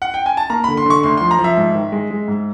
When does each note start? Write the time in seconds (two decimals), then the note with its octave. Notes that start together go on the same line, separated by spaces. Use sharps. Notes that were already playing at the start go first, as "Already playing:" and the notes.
0.02 F#5
0.14 G5
0.26 G#5
0.37 A5
0.50 A#3 A#5
0.64 D3 B5
0.77 C6
0.86 D3 C#6
1.03 D2 C6
1.17 F3 C6
1.31 A#5
1.39 F3
1.44 E5
1.57 G#2
1.75 D#3
1.92 G#3
2.10 G#3
2.28 G#2